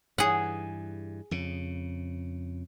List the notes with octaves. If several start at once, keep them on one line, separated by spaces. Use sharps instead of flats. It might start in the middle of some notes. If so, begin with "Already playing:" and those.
G2 E3 G#4 F#5
F2 C#3